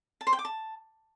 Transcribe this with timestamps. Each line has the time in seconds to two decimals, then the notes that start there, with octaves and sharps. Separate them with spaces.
0.21 A5
0.27 C5
0.33 G5
0.39 D6
0.45 A5